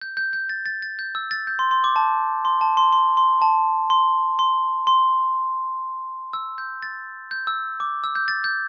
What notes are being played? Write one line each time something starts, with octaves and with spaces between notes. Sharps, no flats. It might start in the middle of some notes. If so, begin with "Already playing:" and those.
G6
G6
G6
A6
A6
A6
G6
E6
A6
G6
C6
C6
D6
A5
C6
A5
C6
C6
C6
A5
C6
C6
C6
E6
G6
A6
G6
E6
D6
E6
G6
A6
G6